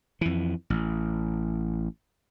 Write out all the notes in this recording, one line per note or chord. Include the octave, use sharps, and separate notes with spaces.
F2 E3
A1